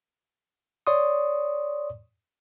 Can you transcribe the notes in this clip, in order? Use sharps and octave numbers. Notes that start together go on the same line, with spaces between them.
C#5 D5 C6 C#6 D#6